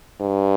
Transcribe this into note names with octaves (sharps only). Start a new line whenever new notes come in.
G2